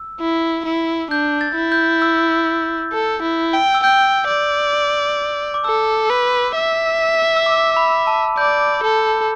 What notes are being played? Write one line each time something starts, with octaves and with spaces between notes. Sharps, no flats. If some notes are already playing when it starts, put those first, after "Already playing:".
Already playing: E6
E4
E4
D4 G6
A6
E4
G6
E6
A4
E4
G5
E6
G5 G6
D5
D6
A4 E6
B4
E5
E6
D6
B5
A5
D5 G6
A4